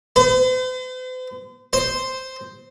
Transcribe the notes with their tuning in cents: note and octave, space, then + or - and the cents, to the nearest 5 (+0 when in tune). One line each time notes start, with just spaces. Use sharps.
C5 -45
C5 -5